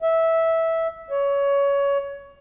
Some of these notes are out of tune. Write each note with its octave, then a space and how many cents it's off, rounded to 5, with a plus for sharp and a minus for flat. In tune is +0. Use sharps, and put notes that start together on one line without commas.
E5 -10
C#5 +20